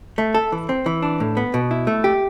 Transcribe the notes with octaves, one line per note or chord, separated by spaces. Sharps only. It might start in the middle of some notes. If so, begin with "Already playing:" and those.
A3
A4
E3
C4
E3
D4
A2
B3
B2
E4
A3
G4